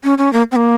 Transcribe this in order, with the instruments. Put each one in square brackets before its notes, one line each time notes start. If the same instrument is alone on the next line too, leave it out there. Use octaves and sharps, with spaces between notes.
[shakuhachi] C#4
C#4
A#3
C4
A#3